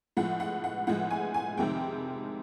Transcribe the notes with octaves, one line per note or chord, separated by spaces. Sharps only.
A2 F3 G#3 F#5
F#5
F#5
A2 F3 G#3 F#5
G#5
G#5
F2 C3 D#3 G#3 C4 G5